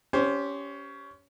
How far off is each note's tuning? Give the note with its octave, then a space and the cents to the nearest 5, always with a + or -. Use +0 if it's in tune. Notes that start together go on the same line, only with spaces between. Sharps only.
C#4 +20 G4 +0 C5 +0